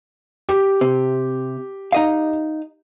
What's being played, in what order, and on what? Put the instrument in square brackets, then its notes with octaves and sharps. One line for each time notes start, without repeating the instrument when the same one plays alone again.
[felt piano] G4
[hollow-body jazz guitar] C3
D#4 D#5 F5